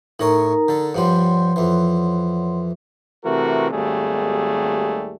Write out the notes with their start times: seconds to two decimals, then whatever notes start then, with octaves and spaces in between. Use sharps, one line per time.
0.19 A2 D#4 A#4 C#5 A#5 C6
0.68 D3 A4
0.94 G2 F3 G3 C#5 F#5 C6
1.56 F2 E3
3.24 C3 E3 A3 F#4 A#4
3.71 G#1 D#2 G3 A3 G#4